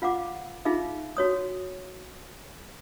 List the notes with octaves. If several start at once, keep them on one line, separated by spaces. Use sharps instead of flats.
F4 F5 F#5 D6
D#4 F4 G#4 E5 F5
F#4 C#5 D#6